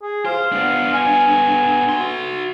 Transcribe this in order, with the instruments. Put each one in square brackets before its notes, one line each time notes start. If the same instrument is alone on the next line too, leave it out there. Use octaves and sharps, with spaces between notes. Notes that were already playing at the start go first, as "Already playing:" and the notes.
[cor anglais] G#4
[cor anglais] F4 [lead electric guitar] C5
[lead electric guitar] B3 D4
[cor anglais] G#5
[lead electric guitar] F#4 C6